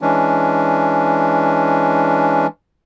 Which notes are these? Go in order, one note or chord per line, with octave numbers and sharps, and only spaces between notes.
E3 G#3 C#4 D4